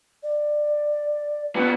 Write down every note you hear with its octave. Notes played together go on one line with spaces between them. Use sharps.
D5
A#2 B3